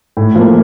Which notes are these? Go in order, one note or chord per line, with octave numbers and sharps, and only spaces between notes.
A2
F3 A#3